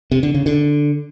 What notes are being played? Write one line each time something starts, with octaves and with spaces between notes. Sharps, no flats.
C3
D3
C#3
D3